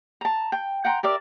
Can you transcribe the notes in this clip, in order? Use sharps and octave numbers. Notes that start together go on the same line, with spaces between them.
A5 A#5
G5
F#5 G5 A#5 C6
G4 A#4 D5 E5